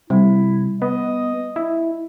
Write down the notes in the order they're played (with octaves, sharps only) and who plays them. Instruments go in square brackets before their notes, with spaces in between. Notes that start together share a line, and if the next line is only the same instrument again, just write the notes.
[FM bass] C3 [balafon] G3 [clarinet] E4
[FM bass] B3 [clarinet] D#5
[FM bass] E4